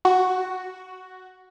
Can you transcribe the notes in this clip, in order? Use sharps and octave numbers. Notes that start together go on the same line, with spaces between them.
F#4